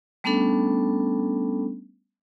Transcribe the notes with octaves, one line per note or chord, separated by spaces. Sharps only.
G3 A3 B3 C#4 D4 A4